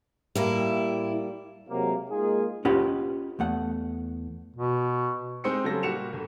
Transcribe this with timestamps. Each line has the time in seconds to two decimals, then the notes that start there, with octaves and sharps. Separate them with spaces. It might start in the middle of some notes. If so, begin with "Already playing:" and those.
0.35 A2 G3 A#3 E4
1.69 C3 F#3 G#3 A#3
2.10 G#3 A#3 D#4 F4 G#4
2.65 C#4 F4 G4 B4 D#5 F#5
3.39 E2 A3 F#5
4.56 B2
5.44 G#3 C4 D#4 E6 C#7
5.64 C#3 F#3 G3 A4 C5 A#6
5.83 A#2 G3 F#4 C#7 E7 F7
6.13 G1